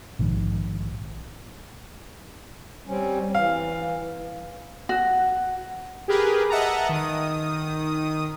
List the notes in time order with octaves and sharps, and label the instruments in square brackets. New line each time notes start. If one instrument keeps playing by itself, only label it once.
[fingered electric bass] A#1 G#2 D#3 F3
[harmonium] G3 C4 C#4
[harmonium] E3 [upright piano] F5
[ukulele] F#4
[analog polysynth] G4 G#4 A#4 B4
D#5 E5 F#5 A5 A#5
D#3 D#6